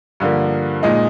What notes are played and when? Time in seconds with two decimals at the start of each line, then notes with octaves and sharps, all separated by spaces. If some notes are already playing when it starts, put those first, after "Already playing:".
0.20 G2 D3 F3 A#3
0.83 A#2 G#3 D#4